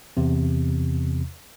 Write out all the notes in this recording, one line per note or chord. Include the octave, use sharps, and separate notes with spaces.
E2 C3